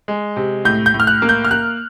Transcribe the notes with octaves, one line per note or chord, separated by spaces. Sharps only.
G#3
C3
A2 G6
G6
A2
F6
F#6
A#3
G6
F6
A#3 F#6